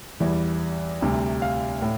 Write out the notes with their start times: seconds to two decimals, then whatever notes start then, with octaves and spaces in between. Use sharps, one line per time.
0.20 E2 E3 G3
1.01 D2 C3 G3
1.42 F5
1.82 A2